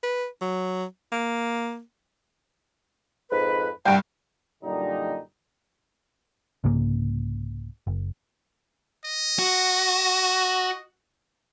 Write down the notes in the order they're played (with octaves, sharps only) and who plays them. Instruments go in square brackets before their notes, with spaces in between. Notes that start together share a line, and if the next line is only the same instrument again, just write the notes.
[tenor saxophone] B4
F#3
A#3
[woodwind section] F2 G#2 B4
[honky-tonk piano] C2 G2 [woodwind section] F#5 G5
[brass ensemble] F#2 A#2 D3 G3 D#4
[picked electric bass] C2 G#2 C#3 A#3
F#1
[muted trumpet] D#5
[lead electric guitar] F#4